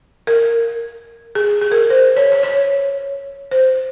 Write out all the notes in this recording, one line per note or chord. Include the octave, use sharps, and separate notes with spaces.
A#4
G#4
G#4
A#4
C5
C#5
C#5
C#5
C5